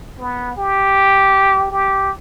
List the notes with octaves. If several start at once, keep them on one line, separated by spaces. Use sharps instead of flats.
B3
G4
G4